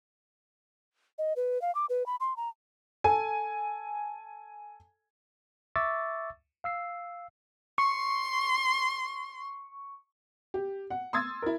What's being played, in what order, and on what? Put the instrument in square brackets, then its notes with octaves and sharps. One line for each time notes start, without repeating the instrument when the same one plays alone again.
[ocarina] D#5
B4
F5
D6
B4
B5
C6
A#5
[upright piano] A4 G#5
[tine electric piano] E5 C#6 D6 E6 A6
F5 E6 C7
[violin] C6 [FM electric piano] C#6
[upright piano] G4
F#5
C6 D#6 E6 G#6 A6
E4 A#4